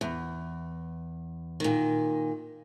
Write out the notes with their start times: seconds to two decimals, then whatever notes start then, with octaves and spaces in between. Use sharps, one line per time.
0.01 E2
1.60 A#2 D#3